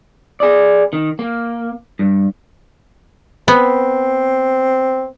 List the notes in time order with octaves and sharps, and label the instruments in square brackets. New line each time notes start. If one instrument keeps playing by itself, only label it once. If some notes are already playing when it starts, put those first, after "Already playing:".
[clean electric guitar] G#4 D5
D#3
A#3
G2
[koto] B3 [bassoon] C4